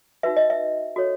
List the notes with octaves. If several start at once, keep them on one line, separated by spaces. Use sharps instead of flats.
D#4 F#4 B4 E5
D#5
E5
F#4 A4 C#5